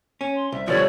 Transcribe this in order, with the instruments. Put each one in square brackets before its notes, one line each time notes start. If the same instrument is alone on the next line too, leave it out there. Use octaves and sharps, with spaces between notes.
[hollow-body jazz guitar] C#4
[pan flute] C6
[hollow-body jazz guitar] C2 [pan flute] E5
[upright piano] B2 D3 G3 [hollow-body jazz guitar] F3 [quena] C#5 [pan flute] D5